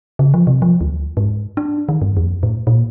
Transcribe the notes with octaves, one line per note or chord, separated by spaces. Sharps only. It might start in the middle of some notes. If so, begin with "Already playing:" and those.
C#3
F3
C3
F3
D2
G#2
D4
D#3
G2
F2
A2
A#2